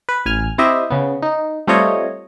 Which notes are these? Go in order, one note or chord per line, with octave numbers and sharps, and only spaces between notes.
B4
A1 G#5 F6
C4 E4 G4 D#5 E5
C#3 B3
D#4
G3 A3 C4 F4 C#5 D#5